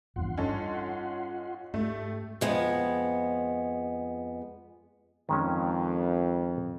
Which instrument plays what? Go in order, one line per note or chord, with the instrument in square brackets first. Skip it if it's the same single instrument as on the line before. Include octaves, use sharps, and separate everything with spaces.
[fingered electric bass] G#1 E2 G2 [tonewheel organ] F4 F#5 C6
[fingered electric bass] G2 [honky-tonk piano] C#4 D#4 A4
[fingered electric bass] G#2 [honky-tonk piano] A3 [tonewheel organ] G4 A4
[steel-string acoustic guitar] F2 G#3 B3
[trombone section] F2 [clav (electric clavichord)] D#3 G#3 C#4